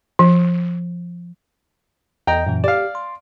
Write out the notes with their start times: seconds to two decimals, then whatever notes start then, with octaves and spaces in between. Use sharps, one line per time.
0.19 F3
2.27 E2 D#5 G5 A#5
2.47 F#2 A#2 E3
2.64 G4 D5 F5
2.95 C6